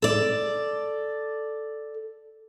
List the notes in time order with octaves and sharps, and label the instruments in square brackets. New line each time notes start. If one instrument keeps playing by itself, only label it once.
[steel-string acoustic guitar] A4 D5